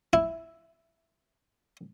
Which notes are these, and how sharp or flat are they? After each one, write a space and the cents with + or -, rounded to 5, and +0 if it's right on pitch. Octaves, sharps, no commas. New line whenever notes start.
E4 +0